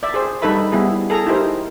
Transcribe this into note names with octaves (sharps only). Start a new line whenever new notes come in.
D5 E5
G#4 C5
G3 D#4 A4 B4 E5 B5
G3 B3 E4 G#4
G#4 A4 A#5
D#4 E4 G4 A#4 C5